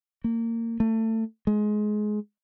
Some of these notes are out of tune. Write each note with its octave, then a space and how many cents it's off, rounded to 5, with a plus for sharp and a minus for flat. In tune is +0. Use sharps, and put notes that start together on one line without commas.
A#3 -25
A3 +25
G#3 +20